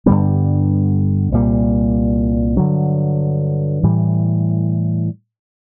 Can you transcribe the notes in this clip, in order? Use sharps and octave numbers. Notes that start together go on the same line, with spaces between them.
G2 D3 G3 B3
C2 A#2 G3
G2 D3 F#3
A2 E3 G3